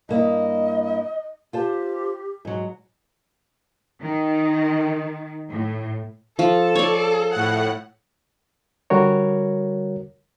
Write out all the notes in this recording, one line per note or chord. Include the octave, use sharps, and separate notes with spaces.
G2 A#3 E4 D#5
F4 G4 C5 A5
G#2 F#3
D#3
A2
F3 A4
C#5 D5
A2 F#5
D3 G3 F#4 A#4 C#5